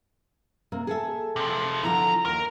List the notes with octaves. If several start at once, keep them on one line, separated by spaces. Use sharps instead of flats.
C3 A#3
G#4 A4 E5
C3 F3
E2 D3 F3 E4 A#5
D#2 A#4